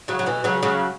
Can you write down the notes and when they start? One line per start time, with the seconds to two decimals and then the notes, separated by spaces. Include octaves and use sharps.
0.08 C#3 F#3
0.19 F#3
0.26 B2 E3
0.44 C#3 F#3
0.63 C#3 F#3